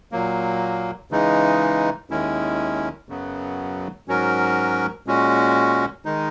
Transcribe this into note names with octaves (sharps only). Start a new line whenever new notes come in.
A#2 F#3 A#3
C#3 E3 G#3 D#4
D#2 D#3 G#3 C#4 E4
F#2 C#3 F#3 B3
G#2 F#3 C#4 F#4 A#4
A#2 G#3 C#4 F#4
D#3 G#3 D#4